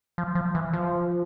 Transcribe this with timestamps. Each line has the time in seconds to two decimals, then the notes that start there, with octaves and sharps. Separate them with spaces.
0.18 F3
0.35 F3
0.55 E3
0.73 F3